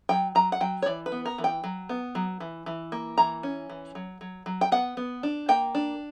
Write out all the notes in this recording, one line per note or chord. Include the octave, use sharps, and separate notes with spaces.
F#3 G5
F#3 A#5
F#5
F#3 G5
C#5
E3 D5
B4
B3
A#4
E3
G5
F#3
B3
F#3
E3
E3
A#3
E3 A#5
C#4
E3
F#3
F#3
F#3
G5
B3 F#5
B3
D4
A#3 G5
D4